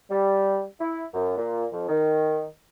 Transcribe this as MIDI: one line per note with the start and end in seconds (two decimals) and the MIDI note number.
0.10 0.61 55
0.79 1.03 64
1.12 1.34 42
1.37 1.65 46
1.72 1.87 41
1.89 2.45 51